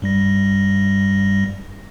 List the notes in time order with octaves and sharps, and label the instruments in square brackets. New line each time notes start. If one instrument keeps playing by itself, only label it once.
[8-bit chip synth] G2 G3 A#6